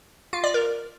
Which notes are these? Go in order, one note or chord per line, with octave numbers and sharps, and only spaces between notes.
F4
D5
A#4